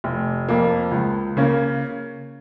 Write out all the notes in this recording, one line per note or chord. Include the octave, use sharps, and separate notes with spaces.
F1
F2 F3 A#3
C#2
C#3 A#3 C#4